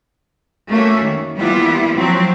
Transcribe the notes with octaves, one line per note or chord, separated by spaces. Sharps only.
A3 A#3 C#4 F#4 E5
D#3
E3 G3 A#3 B3 E4 F4
F3 F#3 C4